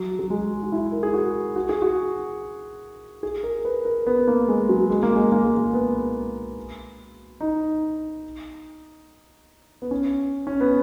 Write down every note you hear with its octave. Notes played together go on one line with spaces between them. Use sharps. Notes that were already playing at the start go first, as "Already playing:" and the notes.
Already playing: F#3
F#3
G#3
F#4
E4
A#4
G#4
F#4
F#4
G#4
F#4
G#4
A#4
B4
A#4
B3
B3
A#3
G#3
F#3
G#3
A#3
G#3
A#3
G#3
A#3
B3
D#4
B3
C#4
C#4
B3